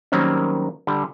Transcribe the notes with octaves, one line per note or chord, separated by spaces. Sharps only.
D#3 F#3 G3 A#3 C4 C#4
D3 G3